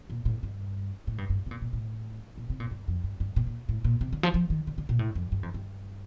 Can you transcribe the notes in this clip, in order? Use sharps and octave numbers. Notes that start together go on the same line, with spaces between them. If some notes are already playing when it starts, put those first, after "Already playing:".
A#2
A2
G2
A2
G2
G2
C3
A#2
A#2
A2
A#2
C3
A#2
G2
F2
G2
G2
A#2
A#2
A2
A#2
C3
D3
F3
F3
D#3
D3
D3
A#2
A2
F2
G2
F2
G2